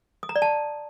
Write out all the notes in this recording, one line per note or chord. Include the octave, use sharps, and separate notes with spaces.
D#6
A#5
D5
A5